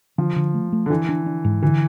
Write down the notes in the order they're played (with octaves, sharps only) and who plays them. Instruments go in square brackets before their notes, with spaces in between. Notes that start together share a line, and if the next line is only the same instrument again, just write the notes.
[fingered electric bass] D3 [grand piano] F3
[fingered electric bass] D3
A3
A3
[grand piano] D3
[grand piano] E3 [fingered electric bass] D4
[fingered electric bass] D4
D4
G#2
[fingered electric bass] D3 [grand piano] E3